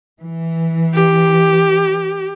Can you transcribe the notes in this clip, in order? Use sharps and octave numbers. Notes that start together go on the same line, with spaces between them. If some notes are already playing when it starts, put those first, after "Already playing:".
E3
G4